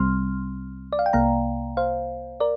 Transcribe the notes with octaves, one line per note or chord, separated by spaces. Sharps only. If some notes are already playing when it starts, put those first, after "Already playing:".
Already playing: C2 C3 G3 C4 C6 F6
D5
F5
G5
C2 C3 A#3 F5 A#5
C5 F5
A#4 D5